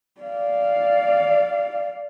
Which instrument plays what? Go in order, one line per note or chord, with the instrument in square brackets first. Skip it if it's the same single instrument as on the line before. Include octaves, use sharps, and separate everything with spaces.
[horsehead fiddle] D5 F5